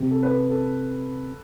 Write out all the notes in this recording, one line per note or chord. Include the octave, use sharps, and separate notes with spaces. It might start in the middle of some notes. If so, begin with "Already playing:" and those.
Already playing: C3
A4
B4
A4
A4